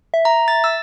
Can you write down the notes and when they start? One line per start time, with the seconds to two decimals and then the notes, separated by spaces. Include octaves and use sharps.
0.14 E5
0.25 A#5
0.48 A6
0.64 E6